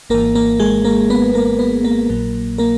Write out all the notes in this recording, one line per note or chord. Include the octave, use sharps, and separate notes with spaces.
G#1 G#2 E3 A#3 A#4
A#3 A#4
G#3 G#4
A#3 A#4
B3 B4
A#3 A#4
B3 B4
A#3 A#4
A#1 A#2 F#3
A#3 A#4